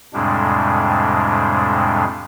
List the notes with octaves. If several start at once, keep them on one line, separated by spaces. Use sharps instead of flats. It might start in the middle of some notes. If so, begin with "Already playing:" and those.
F2 A2 C3 G3 G#3 D4